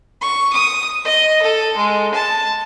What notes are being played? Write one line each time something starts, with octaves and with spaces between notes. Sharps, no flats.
C#6
D#6
D#5
A4
G#3
A5